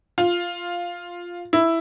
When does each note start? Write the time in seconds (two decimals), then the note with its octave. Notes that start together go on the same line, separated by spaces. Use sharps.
0.18 F4
1.53 E4